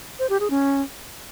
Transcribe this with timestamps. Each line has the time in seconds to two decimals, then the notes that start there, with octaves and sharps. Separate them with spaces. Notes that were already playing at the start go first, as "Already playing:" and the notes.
0.19 C5
0.30 G4
0.40 G#4
0.50 C#4